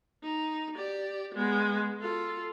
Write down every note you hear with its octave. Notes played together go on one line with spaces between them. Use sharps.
D#4
G4 D5
G#3 B3
F4 A4